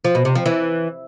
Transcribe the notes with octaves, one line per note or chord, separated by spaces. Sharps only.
F3
B2
C3
F3
E3